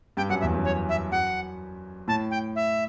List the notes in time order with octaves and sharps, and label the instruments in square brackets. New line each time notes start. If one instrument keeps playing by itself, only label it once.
[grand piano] G2 [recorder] G5
[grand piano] F#2 [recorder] F#5
[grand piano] E2 [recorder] E5
[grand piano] F#2
[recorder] C#5
E5
[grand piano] F#2 [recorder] F#5
[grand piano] A2 [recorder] A5
[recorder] G5
E5